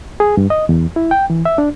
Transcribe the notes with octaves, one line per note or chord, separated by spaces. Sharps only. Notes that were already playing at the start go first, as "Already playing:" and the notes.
G#4
G2
D#5
E2
E4
G5
E3
E5
D4